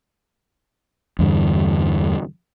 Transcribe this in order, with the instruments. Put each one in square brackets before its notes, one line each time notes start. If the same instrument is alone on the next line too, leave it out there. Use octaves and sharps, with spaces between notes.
[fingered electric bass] E2 G2 D3